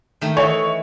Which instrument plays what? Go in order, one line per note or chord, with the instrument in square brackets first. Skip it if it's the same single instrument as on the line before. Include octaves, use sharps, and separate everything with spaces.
[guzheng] D#3 A3
[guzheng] E3 [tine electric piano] A4 D#5 E5 [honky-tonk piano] C#5